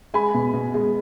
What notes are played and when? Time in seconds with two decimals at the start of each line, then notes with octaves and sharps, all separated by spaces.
0.14 G#3 G#5 B5
0.34 B2
0.54 B2
0.74 G#3